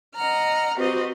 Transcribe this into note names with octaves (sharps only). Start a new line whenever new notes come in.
D#5 F#5 A#5 F6
C4 F#4 G4 B4 C5 D#5